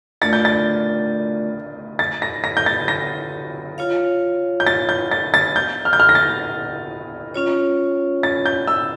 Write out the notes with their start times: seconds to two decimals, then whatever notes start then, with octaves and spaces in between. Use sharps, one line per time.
0.22 A3 D4 F4 A#4 D5 A6
0.33 G6
0.45 A6
1.99 A6
2.22 A#6
2.44 A#6
2.57 G6
2.66 A6
2.88 A#6
3.78 F4 C#5 F5
4.60 G6
4.67 A6
4.89 G6
5.11 A6
5.34 A6
5.56 G6
5.85 F6
5.93 G6
6.00 F6
6.09 A#6
6.15 A6
7.34 C#4 F4 C#5
8.23 A6
8.46 G6
8.67 E6